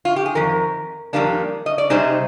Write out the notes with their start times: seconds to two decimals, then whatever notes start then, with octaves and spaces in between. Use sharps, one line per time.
0.05 F4
0.16 G4
0.26 G#4
0.35 F2 D#3 A#4
1.13 F2 D#3 G3 A#3 D4
1.66 D#5
1.78 D5
1.90 C3 G3 C4 D#4 G#4 C5